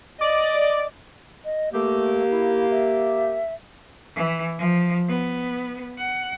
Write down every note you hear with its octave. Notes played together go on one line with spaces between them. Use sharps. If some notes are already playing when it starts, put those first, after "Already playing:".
D5 D#5
D#5
A3 A#3 G4
E4
E5
E3
F3
B3
F#5